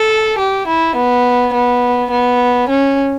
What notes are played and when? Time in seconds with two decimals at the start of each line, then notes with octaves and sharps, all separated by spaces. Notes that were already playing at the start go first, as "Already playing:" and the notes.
Already playing: A4
0.39 G4
0.67 E4
0.96 B3
1.54 B3
2.11 B3
2.69 C#4